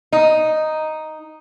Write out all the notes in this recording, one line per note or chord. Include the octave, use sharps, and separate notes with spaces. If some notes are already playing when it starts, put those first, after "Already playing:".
D#4